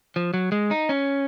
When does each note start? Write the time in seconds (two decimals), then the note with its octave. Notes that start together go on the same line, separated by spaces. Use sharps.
0.16 F3
0.34 F#3
0.52 G#3
0.71 D#4
0.89 C#4